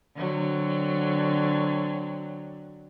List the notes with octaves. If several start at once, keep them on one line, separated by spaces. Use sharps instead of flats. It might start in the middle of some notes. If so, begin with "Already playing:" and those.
D3 F#3 C4